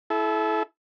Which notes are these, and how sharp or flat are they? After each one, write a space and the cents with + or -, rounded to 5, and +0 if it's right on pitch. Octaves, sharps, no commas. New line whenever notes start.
E4 +0 A4 -35